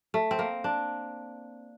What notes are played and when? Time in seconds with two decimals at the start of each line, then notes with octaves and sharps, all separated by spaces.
0.14 A3
0.31 C4
0.39 A#3
0.64 D4